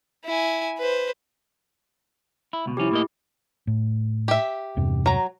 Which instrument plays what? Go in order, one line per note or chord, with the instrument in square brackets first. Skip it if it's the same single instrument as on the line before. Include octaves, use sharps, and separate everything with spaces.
[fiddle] E4 G#5
B4 C5
[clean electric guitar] E4
C#2 B2
[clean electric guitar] C2 F3 C#4 [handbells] E4 G4
[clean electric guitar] A2 A#3 D#5
[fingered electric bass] A2
[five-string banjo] G4 E5
[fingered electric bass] E2 G2 C3
[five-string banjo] F#3 A#5